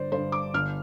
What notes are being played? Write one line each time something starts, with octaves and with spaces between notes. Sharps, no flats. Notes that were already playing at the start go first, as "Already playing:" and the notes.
Already playing: G1 G2 D3 C5 D5
G2 D3 C5
D6
G1 F6